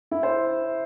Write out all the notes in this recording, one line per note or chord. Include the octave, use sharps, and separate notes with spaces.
E4 E5
C5